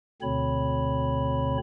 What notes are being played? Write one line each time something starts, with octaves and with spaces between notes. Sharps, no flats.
D2 B2 D3 C4 C#5 B5